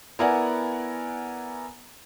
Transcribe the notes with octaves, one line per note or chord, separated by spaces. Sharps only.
B3 E4 A#4 D5 F#5 G#5